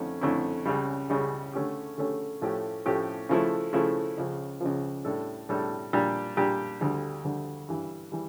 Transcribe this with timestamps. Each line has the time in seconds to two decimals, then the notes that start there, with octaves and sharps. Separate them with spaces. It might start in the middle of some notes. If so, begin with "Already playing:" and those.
Already playing: F2 D3 A3 C#4 E4
0.21 F2 D3 A3 C#4 E4
0.66 C#2 C#3 G3
1.10 C#2 C#3 G3
1.53 D3 A3 C#4 G4
1.98 D3 A3 C#4 G4
2.41 A2 F3 A3 C#4 G4
2.85 A2 F3 A3 C#4 G4
3.29 C#3 F3 A3 E4
3.73 C#3 F3 A3 E4
4.18 C#2 C#3 F3
4.61 C#2 C#3 F3
5.05 A2 G3 D4 A4
5.49 A2 G3 D4 A4
5.93 A#2 G3 D4 G4
6.37 A#2 G3 D4 G4
6.81 D2 D3 G3
7.24 D2 D3 G3
7.68 G2 E3 G3
8.12 E3 G3